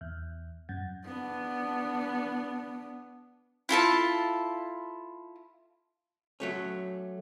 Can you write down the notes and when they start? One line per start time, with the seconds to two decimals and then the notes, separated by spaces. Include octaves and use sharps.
0.01 E2
0.69 F#2
1.05 B3 D4
3.69 E4 F4 A4 A5
6.40 F#3 A3 C#4